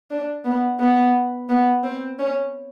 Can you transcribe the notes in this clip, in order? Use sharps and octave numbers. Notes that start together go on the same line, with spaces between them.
D4
B3
B3
B3
C4
C#4